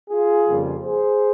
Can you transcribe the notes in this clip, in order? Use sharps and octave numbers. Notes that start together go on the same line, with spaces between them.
F4 G#4
F2 C#3 G3 A#3
G#4 C5